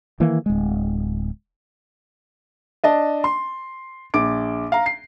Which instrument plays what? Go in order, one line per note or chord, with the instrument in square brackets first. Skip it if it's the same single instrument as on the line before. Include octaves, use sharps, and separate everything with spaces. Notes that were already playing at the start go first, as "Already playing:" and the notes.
[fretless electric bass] D#3 E3 A#3
D1 G#3
[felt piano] D4 D#5 A5
C6
A#1 D6 D7
F5 A#5
C7